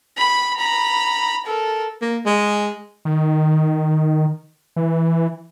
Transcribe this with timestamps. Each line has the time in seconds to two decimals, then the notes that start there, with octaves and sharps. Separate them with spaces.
0.18 B5
0.57 A#5 B5
1.46 A4 A#4
2.02 A#3
2.26 G#3
3.05 D#3
4.76 E3